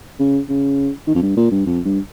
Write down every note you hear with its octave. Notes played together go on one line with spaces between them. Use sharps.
C#3
C#3
D#3
F2
G2
A#2
G2
F2
G2